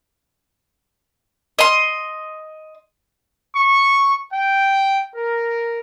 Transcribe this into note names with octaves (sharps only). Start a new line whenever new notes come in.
D#5 C6
C#6
G5
A#4